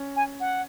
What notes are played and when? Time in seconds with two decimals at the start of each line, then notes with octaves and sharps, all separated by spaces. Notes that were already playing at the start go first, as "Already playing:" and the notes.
Already playing: C#4
0.16 G#5
0.40 F#5